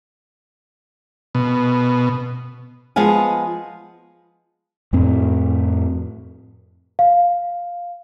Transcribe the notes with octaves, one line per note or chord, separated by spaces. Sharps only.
B2
F3 G#3 B3 F5 G#5
F2 A2 C4
F5